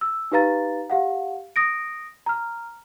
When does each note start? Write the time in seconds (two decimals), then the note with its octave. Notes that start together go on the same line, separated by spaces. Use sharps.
0.01 E6
0.32 D#4 G4 B4 F5 A#5 A6
0.90 G4 F5 F#5
1.56 D#6 A#6 D7
2.26 A#5 F6